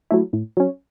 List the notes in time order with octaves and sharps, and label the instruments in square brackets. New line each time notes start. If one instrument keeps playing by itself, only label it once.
[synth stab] F#3 A3 E4
A2
F#3 C#4